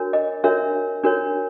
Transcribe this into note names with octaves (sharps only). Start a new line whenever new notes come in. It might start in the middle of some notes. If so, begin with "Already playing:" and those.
Already playing: D4 F#4 A#4 C#5
D#5
D4 F#4 A#4 C#5 E5
D4 F#4 A#4 C#5